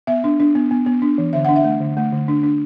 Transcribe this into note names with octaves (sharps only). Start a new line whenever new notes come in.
B3 E5
D4
D4
B3
B3
B3
D4
E3
D3 E5
D4 F#5
E5
A3
D3
A3
D3
D4
D4